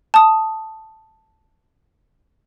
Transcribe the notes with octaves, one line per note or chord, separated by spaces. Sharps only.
A5 D#6